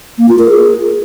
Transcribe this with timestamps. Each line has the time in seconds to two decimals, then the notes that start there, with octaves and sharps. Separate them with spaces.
0.18 A#3
0.28 F4
0.39 A#4
0.49 G#4